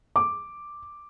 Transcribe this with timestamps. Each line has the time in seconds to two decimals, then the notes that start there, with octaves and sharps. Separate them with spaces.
0.16 D6